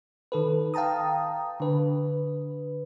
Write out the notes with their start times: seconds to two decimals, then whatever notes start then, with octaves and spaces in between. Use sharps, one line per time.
0.32 D#3 A4 B4
0.74 F5 G5 A5 A#5 D#6
1.60 D3 B4